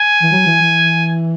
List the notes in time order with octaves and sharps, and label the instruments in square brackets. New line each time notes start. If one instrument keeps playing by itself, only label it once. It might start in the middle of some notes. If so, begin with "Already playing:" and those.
Already playing: [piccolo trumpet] G#5
[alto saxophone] E3
F#3
E3
E3